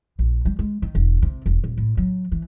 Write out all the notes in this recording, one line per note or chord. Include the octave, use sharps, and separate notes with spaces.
A#1
G3
G#3
D#3
E1
C3
E1
D#1
A2
F#3
E3